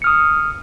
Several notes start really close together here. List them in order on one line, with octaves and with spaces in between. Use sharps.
C#7 F6 D#6